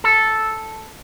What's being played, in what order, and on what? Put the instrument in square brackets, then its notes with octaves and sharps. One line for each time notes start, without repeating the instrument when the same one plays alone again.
[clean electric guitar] A4